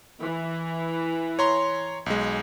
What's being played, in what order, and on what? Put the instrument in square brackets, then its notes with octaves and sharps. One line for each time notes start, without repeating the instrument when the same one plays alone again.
[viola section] E3
[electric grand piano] C#5 A#5 C6
B1 G#3